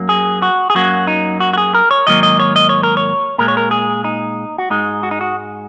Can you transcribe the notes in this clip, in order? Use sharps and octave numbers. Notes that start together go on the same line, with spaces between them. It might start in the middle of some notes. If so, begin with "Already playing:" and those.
Already playing: F#2 F#3 A#3
G#4
F#4
G#4
F#2 F#3 A#3 F#4
D#4
F#4
F#4
G#4
A#4
C#5
G#2 D#3 F#3 A#3 D#5
D#5
C#5
D#5
C#5
A#4
C#5
A#2 G#3 A#4
C#5
A#4
G#4
D#4
F#4
G#2 G#3 D#4
F#4
D#4
F#4